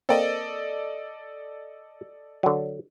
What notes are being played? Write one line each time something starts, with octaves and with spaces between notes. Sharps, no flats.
A#3 C4 A4 D5 D#5
D3 F#3